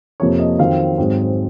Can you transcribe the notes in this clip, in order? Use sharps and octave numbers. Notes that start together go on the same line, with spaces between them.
F2 C3 F3 A#3 C#5
D#5
F2 D#3 F#3 C4 F5
G#2 F#3 C4